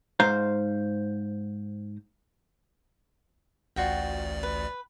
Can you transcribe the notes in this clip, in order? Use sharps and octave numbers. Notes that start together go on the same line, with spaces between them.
G#2 C5 F5 A#5
A1 D2 F4 F#4 D5 G5
B4